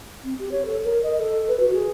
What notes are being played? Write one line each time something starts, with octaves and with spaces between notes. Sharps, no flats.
C4
G4
C#5
A4
A#4
D#5
A4
B4
F#4
G#4